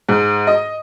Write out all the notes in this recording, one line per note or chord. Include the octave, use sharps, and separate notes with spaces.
G#2
D#5